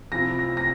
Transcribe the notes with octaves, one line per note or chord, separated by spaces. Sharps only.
C3 F3 C4 E4 A#6
A#6
A#6